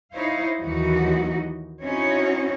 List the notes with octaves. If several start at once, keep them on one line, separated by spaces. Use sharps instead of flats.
D#4 E4 C5 C#5 F5
D#2 E3 F#3 D#4 F#4
C4 C#4 D#4 E4 F#4 C#5